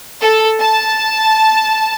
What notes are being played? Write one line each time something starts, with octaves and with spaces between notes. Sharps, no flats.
A4
A5